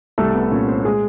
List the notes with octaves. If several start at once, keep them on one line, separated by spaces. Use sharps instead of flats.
C2 A3 A4
B3 B4
A#2 C#4 C#5
C4 C5
G#3 G#4